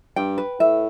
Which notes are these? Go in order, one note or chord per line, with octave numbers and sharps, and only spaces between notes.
G2 G5
B4
A2 E5